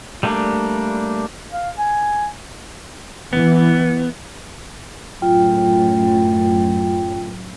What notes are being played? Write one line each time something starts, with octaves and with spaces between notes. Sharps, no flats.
G3 A3 A#3 D4
F5
G#5
E3 B3
F#2 A2 F4 G5